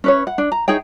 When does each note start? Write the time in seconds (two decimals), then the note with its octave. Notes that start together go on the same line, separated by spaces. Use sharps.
0.04 C#4 B4 C#5
0.27 F#5
0.38 D4
0.52 A#5
0.68 D#4 G#4 C#5 G5